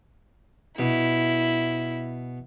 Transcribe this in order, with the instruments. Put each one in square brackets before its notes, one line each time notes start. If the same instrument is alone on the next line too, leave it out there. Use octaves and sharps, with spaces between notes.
[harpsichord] B2 [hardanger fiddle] E4